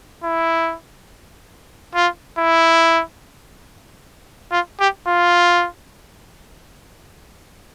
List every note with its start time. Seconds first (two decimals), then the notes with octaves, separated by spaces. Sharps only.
0.24 E4
1.95 F4
2.38 E4
4.51 F4
4.80 G4
5.08 F4